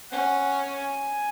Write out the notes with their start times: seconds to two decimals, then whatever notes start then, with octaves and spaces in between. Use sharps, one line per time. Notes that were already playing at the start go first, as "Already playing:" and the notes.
0.11 C#4 F#5
0.58 G#5